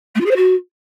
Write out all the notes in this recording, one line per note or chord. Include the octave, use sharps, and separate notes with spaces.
A3
F4
G#4
C5
F#4